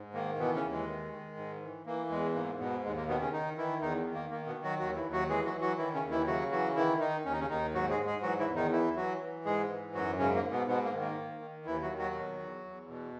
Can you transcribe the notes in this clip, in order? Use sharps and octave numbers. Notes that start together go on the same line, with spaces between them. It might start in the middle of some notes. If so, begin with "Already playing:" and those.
Already playing: G#2
D#3 A#3
B2 E3 B3
C#3 C#4
D#2
G#3
D#3
D#3
G#2
E3
E3 A#3
E2 G#3
G#2 A#3
G#2 B2 B3
D#2 G#3
A#3
B2 D#3 B3
C#3 C#4
D#3 D#4
D#3 E3 E4
E2 D#3 D#4
D#3
A#3
D#3 A#3
B2 B3
D#3
F#3 F#4
D#2 F#3 F#4
E3 E4
D#2
F#3 F#4
E3 G#3 G#4
F#3 F#4
E3
F#3 F#4
D#3 E3 E4
C#3 C#4
D#2
E3 E4
C#3 F#3 F#4
E3 F#3 F#4
D#3 E3 E4
D#3 D#4
D#2 C#4
D#4
C#3 C#4
D#2 D#3 D#4
G#2 F#3 F#4
G#3 G#4
G#2
G#3 G#4
E3 F#3 F#4
E3 E4
E2
D#3 D#4
E3 E4
E3 F#3 F#4
E3
G#2 G#3 G#4
E3
F#2 F#3 F#4
G#2 C#3 C#4
A#3
G#2
B2 B3
G#2 B2 B3
A#3
D#3
A#3
D#3
D#3
D#2 E3 E4
F#3 F#4
D#3
F#3 F#4
B2
E2
E2
B2